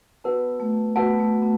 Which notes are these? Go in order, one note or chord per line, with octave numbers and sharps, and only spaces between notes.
B3 F#4 B4 F#5 A5
A3
B3 F#4 B4 F#5 A5
A3
B3